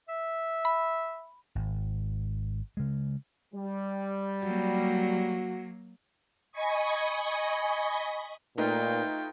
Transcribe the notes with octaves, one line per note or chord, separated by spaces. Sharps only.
E5
B5
G#1
C#3 G#3
G3
F#3 A#3 F#4
D#5 G#5 B5 C#6 D#6
A#2 A3 D#4 F4 B4 G5